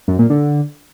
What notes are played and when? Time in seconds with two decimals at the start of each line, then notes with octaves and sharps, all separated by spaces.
0.08 F#2
0.19 A#2
0.30 D3